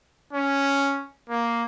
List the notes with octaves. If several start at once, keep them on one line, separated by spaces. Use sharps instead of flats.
C#4
A#3